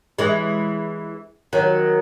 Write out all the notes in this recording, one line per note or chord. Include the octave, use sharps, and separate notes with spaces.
E3 G#3
D#3 F#3